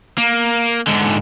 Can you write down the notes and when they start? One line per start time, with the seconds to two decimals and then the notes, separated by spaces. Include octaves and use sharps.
0.18 A#3
0.87 G#2 D3